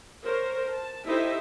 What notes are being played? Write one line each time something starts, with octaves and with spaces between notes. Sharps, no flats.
A#4 C5 C#5
A5
D#4 E4 G4 A4 C5 E5